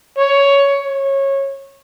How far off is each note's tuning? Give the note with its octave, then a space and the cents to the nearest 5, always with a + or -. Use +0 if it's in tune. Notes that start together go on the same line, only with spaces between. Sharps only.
C#5 +10
C#5 -20